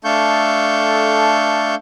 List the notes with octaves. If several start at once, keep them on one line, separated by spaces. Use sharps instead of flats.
A3 D4 A4 F5 C#6 G6